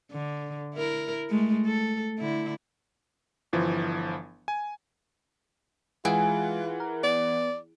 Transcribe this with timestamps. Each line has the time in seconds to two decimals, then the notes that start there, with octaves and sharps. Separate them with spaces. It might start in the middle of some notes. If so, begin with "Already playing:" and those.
0.12 D3
0.75 E4 A#4
1.31 G#3 A3
1.66 A4
2.20 D3 E4
3.53 G1 E3 F3
4.48 G#5
6.05 E3 G#3 E4 F4 G#4 F#5 D7
6.80 A#4
7.04 B3 D5